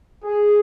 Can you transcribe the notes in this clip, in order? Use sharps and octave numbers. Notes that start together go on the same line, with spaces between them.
G#4